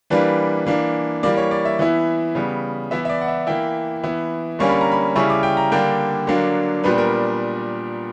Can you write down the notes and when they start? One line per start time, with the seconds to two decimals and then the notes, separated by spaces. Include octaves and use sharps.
0.10 E3 G3 A#3 D4 B4
0.67 E3 A#3 D4
1.23 E3 G3 A#3 D5
1.37 C#5
1.51 D5
1.65 E5
1.79 E3 B3 E4
2.35 C#3 G3 B3
2.91 E3 B3 E4 E5
3.05 E5
3.09 D5
3.21 F#5
3.28 E5
3.47 E3 A#3 E4 G5
4.04 E3 B3 E4
4.59 D3 G3 A#3 C#4 C#6
4.70 B5
4.81 A#5
4.92 B5
5.15 C#3 G3 C#4 E4 C#6
5.30 D6
5.43 G5
5.57 A#5
5.72 D3 G3 A#3 D4 G5
6.27 D3 F#3 A#3 D4
6.84 A#2 G3 B3 D4 B4
6.98 A#4